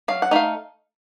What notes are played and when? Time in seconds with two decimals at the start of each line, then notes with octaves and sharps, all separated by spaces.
0.08 F#3 F5
0.22 F#5
0.31 A3 D#4 F5